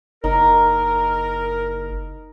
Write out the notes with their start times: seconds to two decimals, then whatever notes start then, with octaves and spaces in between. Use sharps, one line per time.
0.24 F#1 D#4 A#4